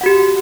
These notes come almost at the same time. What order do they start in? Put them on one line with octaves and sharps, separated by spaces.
F#5 F#4 G4